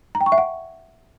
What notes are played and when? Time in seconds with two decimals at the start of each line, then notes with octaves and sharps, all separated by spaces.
0.15 A#5
0.21 G5
0.26 C#6
0.32 E5
0.38 F#5